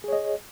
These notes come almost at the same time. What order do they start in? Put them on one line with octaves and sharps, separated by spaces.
G#4 C#5 D#5